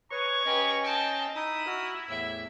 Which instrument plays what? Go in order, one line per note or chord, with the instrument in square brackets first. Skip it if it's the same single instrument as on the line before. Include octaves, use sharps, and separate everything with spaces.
[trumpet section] G#4 A#5 C#6 [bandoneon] B4 C#5
[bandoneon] C#4 D#5 [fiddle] G4 B4
[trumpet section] C4 D#4 G5 [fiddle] A5
[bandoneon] D#4 [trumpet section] E4 [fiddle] D#6
[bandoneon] F#4 E6 F6
[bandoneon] E2 A2 [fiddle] E5